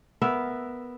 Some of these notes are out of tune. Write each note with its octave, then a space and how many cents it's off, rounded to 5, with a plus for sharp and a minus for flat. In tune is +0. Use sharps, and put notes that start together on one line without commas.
B3 +0 A#4 +0 E5 +0